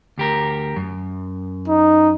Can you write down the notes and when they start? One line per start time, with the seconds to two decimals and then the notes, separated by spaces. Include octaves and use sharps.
0.18 D2 G4 A#4
0.76 F#2
1.68 D#4